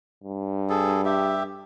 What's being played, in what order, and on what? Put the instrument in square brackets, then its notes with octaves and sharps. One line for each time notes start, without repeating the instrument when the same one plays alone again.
[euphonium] G2
[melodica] G#4 A4
G4 E5